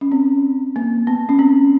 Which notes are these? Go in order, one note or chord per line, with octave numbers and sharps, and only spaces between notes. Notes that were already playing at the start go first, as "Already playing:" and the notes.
C#4
C4
A#3
B3
C#4
C4